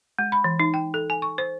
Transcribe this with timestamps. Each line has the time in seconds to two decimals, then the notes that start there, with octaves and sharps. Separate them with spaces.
0.19 G#3
0.32 B5
0.44 E3
0.60 D#4
0.74 G5
0.94 A4
1.10 G#5
1.22 C#6
1.38 C5